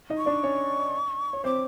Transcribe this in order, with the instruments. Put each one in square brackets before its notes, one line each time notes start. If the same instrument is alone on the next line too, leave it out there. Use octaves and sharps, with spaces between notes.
[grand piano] D#4 D#5
[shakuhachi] C#6
[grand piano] D4 D5
C#4 C#5
C#5
[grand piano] C4 C5 [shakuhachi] D6